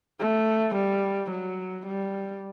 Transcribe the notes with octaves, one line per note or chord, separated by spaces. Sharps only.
A3
G3
F#3
G3